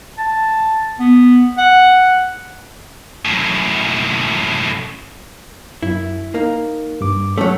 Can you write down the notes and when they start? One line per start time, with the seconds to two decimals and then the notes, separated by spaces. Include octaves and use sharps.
0.18 A5
0.99 B3
1.58 F#5
3.25 F#2 A2
5.83 F#2 E4
6.35 A#3 D#4
7.01 G2 D6
7.38 F#3 A3 C#4 A5